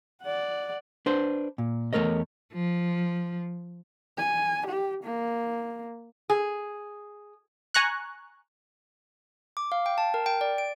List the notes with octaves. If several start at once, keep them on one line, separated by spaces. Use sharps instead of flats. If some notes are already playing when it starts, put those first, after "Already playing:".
D5 F#5
D4 B4 C5
A#2
E2 F#3 A3 A#4 C#5 D#5
F3
G#5
G4
A#3
G#4
G#5 A#5 C#6 F#6
D6
F5
G5
A5
A#4
G5
D5
D7